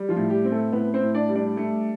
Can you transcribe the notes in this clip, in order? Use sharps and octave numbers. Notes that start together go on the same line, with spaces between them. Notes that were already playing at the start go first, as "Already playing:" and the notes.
Already playing: G3
F3 F4
A2
G3 G4
C4
A3 A4
A2 B3 B4
C4 C5
A2
D4 D5
G3
D4 D5
A3